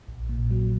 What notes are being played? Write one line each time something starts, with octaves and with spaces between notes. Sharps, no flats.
A#1
A#2
F#3